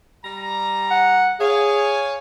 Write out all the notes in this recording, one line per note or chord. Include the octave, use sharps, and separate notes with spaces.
G3 A#5
F#5
G#4 C#5 F5 G#5